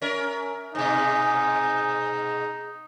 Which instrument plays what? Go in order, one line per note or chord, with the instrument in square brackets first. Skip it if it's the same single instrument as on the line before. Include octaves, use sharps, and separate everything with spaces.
[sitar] C#4 A#4 [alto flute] E5
[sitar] G#2 B2 [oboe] D#4 [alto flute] G#5